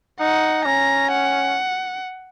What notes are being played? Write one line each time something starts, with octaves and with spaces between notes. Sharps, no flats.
D#4 F#5
C#4 A#5
F#5